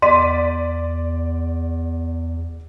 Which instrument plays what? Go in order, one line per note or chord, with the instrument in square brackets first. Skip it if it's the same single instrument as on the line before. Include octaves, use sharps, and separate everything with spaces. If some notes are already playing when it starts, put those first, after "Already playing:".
[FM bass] E2 [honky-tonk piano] D5 B6 D#7 [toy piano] C6